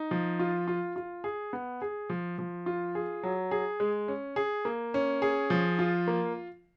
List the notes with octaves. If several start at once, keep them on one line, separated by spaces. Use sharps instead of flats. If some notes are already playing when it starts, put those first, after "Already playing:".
Already playing: D#4
F3
F4
F4
F4
G#4
B3
G#4
F3
F3
F4
G#4
F#3
G#4
G#3
C#4
G#4
A#3
C#4
G#4
F3
F4
A#3